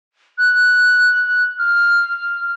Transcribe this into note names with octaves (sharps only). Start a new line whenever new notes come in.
F#6
F6